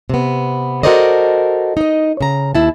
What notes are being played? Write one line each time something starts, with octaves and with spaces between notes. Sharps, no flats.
C3 B3
F#4 A4 A#4 C5 D5 D#5
D#4 D#5
C#3 A#5
D#2 E4 A5